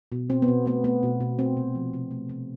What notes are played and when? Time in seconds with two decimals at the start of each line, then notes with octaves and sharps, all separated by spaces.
0.12 B2
0.30 B2 C4
0.42 B3
0.48 B2
0.66 A3 B3
0.84 A3 B3
1.03 B2
1.21 B2
1.38 A3 C4
1.57 C3
1.75 F3
1.93 C3
2.11 A3
2.29 C3